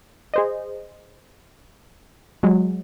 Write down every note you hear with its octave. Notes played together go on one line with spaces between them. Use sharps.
G#4 C5 D#5
F#3 G#3